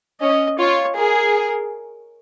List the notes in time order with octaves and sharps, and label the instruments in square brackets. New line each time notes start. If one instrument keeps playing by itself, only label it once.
[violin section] C#4 [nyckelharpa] D#5
[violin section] F4 [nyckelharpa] C#5
[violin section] G#4 [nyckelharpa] A#4